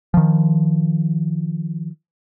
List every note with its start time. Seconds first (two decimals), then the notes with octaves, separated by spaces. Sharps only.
0.14 D#3 F3